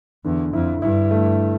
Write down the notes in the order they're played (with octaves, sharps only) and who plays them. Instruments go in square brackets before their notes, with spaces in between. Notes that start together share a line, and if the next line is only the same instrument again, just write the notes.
[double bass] E2 [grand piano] D3
[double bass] F2 [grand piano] E4
[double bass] G2 [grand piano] E4
[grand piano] A3